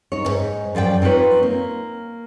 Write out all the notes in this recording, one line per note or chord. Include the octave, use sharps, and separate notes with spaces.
D#4 C#5
D#2 G#2
F#2 F3 D5 G5
C4 D#4 F4 B4 C#5
A#3